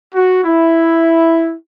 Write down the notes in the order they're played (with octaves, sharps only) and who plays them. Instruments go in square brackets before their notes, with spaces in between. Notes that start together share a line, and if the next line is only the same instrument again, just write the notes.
[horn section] F#4
E4